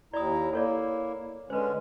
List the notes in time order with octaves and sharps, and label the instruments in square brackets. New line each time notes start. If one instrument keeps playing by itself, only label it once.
[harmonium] D#2 E4 A#5 [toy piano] D5 D#6
[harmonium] A#3 E4 [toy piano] A4 C#5 D5
[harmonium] D3 G#3 C#4 [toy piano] B4 C5